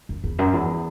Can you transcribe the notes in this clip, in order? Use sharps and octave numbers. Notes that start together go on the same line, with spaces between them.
F#2
E2
F#2
E2